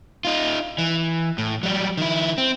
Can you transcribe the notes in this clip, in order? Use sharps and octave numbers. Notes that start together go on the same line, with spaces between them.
D#4 F4
E3
A2
F#3 G3
D#3 E4
C4